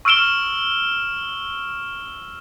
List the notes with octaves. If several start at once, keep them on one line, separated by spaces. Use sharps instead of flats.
C#6 E6 F6 D7 E7 G7